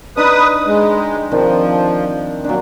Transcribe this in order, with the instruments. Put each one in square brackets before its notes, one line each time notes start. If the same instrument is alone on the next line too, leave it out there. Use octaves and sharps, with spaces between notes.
[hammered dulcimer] D4 D#4 [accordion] B4 D#6
[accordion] G#3
[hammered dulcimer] G5
[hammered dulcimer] D#3 C4 D4 [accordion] F3
[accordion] A#2 [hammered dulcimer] F#3 D4